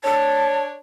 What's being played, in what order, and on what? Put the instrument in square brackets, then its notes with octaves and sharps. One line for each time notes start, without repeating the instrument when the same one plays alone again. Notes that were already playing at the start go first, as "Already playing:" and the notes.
[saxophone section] D4 C#5 [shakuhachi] A5